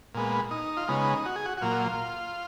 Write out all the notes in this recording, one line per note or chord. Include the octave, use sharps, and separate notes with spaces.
A#2 G#3 B3
D#4
F4
C#3 G#3 B3 D#4
F#4
G#4
F#4
F#4
A#2 F#3 A#3 F4